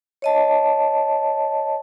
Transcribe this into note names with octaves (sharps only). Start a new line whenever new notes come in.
C#5 D#5 A5